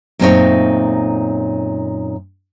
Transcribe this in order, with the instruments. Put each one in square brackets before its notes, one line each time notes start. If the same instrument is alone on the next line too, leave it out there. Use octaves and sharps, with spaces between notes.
[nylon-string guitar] F#2 A#2 A3 C4 D#4 C#5